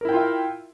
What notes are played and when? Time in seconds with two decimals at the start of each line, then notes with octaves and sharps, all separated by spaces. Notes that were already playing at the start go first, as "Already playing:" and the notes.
0.01 A#4
0.05 E4
0.09 G5
0.13 F4
0.16 E5